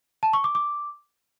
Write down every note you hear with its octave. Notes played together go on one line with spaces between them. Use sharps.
A5
C#6
D6
D6